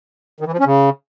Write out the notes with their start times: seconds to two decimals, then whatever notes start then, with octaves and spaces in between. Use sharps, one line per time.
0.41 D#3
0.47 E3
0.53 F3
0.60 C#4
0.66 C#3